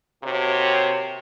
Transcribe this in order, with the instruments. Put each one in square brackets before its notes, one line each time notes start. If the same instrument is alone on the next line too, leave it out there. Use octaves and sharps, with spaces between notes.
[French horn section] D#2 F#4 C#5 [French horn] C3